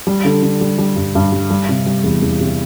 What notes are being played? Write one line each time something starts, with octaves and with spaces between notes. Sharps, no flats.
G3
D3
D3
G3
G3
G2
G2
G3
G3
C3
G3
E2
E2
C3